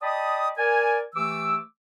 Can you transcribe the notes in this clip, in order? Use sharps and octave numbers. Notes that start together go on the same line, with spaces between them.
D5 D#5 G5 A5 B5 D#6
A#4 D5 G#5
E3 A3 G4 D6 E6